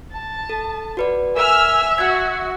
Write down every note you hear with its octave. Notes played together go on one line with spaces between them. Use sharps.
A5
A4
F#4 B4 D5
A#4 E5 G#5 E6 F6
F#4 F#6 G#6